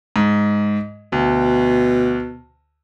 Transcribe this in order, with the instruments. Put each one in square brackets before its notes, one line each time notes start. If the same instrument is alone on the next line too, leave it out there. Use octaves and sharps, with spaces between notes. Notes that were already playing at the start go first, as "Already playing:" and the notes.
[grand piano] G#2
[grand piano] D2 [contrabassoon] B2